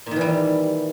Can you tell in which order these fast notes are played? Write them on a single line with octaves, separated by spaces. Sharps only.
A#2 D#3 E3 G3